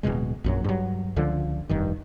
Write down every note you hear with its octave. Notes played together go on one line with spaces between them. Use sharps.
D1 A#1 B2 G#3
A#1 F#2 F#3
G2 F#3
C#2 D3 F3
F1 G2 D#3